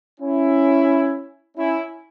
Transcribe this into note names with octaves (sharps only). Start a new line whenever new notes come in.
C#4 E4
C#4 E4